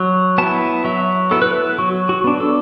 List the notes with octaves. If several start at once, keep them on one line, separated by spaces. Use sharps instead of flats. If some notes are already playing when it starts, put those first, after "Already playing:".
Already playing: F#3
B3 E4 A5
F#3 E5
B3 E4 A4
B4
A4
F#3 F#4
F#4
B3 D4
A4